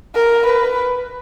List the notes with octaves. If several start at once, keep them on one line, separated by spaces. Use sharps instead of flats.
A#4
B4